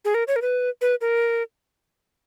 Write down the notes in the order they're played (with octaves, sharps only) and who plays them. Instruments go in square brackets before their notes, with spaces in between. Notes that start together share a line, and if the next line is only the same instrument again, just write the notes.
[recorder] G#4
A#4
C#5
A#4
B4
B4
A#4